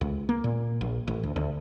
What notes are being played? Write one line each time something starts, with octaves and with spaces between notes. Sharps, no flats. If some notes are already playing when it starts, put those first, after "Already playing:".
C#2
A#3
A#2
A#1
A1
D2
D2